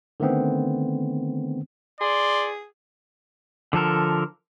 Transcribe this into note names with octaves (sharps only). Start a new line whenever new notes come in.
D3 D#3 A3 B3 C4
G#4 D5 C6
D3 F3 A4 A#4